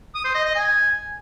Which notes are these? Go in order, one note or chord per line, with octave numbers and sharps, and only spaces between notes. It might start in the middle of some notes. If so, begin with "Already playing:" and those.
D#6
C5
D#5
D#5
G#5